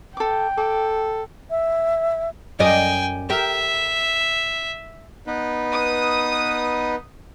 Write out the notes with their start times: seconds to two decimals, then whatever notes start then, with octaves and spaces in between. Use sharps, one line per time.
0.17 A4 G5 D6
0.58 A4 D6
1.50 E5
2.59 F#2 D5 D#5 G5 G#5
3.30 G4 A#4 E5
5.27 B3 D#4 B4
5.72 D#6